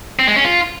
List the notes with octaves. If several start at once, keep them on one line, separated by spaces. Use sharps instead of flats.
C4
G#3
C#4
F4